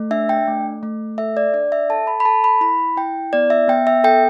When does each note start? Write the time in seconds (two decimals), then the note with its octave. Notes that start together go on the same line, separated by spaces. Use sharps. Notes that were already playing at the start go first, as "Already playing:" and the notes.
Already playing: A3
0.11 D4 E5
0.29 G5
0.48 A3
0.83 A3
1.18 A4 E5
1.37 D5
1.54 D4 D5
1.72 E5
1.89 A4 A5
2.07 B5
2.20 B5
2.25 A4 A5
2.44 B5
2.61 E4 B5
2.97 E4 G5
3.33 B3 D5
3.50 E5
3.68 B3 G5
3.87 E5
4.04 A4 G5